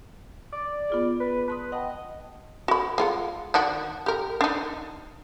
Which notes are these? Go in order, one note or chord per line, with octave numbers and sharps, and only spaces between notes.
D5
B3 F4 G#4
B4
B4 A5 C6 D#6
D#5 F#5 G5 A5
F#4 B5
G#3 F4 F#5
D#3 D4 F#4
G4 A#4
D4 D#4